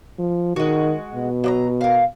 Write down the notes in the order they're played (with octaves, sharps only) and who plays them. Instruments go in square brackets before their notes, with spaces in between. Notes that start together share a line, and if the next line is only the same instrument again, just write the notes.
[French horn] F3
[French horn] D#3 [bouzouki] G#3 F#4
[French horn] B2
[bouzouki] F#3 D5 A#5
A#4 F5